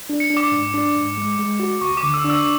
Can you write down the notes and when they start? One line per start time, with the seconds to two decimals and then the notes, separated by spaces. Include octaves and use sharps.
0.09 D4
0.20 C#7
0.30 D4
0.37 D6
0.52 G#2
0.74 D4
0.95 G#2
1.17 G#3
1.39 G#3
1.60 F#4
1.81 D2 C#6
1.97 D6
2.03 D3
2.14 E6
2.24 D4
2.30 E6